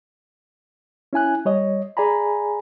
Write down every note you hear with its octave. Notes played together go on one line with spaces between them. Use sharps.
C#4 E4 G#5 F#6
G3 C#5 D#5
G#4 D5 G#5 A#5 B5